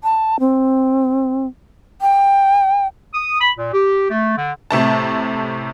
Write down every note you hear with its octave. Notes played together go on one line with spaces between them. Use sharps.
A5
C4
G5
D#6
B5
A#2
G4
A3
D3
A2 C3 A3 A5